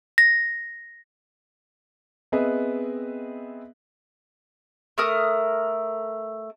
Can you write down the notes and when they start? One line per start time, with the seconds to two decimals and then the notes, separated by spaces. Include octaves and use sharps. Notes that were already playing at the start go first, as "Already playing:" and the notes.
0.18 A#6
2.32 B3 C4 G#4 B4 D#5 E5
4.98 A3 A#4 D#6